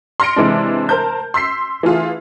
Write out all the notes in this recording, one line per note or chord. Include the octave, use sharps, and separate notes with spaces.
C6 F6 A#6 C#7 D7
C3 E3 G#3 D4
A#4 C5 A5 G6
C6 E6 B6 C7
E3 A3 F4 G#4